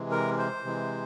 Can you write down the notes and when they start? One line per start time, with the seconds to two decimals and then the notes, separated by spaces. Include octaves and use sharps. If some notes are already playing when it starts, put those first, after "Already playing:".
Already playing: C3 E3 G#3
0.11 A#4
0.38 C5
0.64 C3 E3 G#3